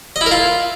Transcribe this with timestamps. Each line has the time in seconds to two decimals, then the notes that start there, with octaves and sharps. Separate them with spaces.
0.16 D#5
0.21 E4
0.26 A#4
0.31 F4